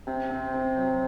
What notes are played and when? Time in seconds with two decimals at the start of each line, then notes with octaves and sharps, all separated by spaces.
0.07 C3 C4
0.31 C4
0.54 C4
0.77 F#3